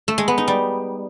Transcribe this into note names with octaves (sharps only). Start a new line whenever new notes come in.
A3
G#3
B3
D#4
G3